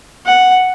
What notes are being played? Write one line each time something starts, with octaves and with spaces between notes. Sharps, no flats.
F#5